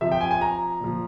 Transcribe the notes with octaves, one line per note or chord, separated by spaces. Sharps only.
C3 F3 E5
G5
G#5
G#5
A#5
A#2 F3